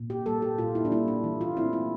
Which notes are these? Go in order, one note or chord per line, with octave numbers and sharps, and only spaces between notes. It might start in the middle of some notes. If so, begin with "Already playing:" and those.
Already playing: A#2
G4
G3 A#3 A4
G4
A#2 F4
E4
D4
G3 A#3 E4
D4
E3
F4
A3 C4 E4
E4